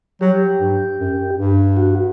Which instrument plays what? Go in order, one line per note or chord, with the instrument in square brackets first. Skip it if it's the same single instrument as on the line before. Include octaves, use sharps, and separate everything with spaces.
[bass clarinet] F#3 [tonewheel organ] G4
[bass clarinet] G2
F#2
G2
[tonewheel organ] F#4